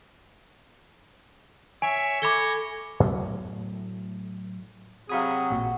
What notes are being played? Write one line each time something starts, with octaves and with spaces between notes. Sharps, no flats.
C#5 E5 G#5
A4 B5 C#6 D6 G#6 A#6 G7
A2 F#3 A3 B3
C3 F#3 G#4 F5 B5 D#6
A1 A#2 F#4